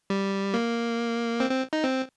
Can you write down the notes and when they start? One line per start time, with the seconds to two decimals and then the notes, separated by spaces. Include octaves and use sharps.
0.10 G3
0.54 A#3
1.40 C4
1.51 C4
1.73 D#4
1.84 C4